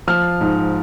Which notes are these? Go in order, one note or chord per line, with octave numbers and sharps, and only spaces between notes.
F3 F6
G#2